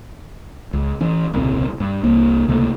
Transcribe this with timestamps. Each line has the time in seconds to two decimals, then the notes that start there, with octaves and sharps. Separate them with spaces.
0.73 C#2
1.01 E3 C#4
1.33 D#1 C2 C#3 C4
1.80 G2
2.04 C2 A#3
2.48 C#2 C3 A3 A#3